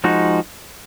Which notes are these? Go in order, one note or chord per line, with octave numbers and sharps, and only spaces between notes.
F3 G#3 D#4 F#4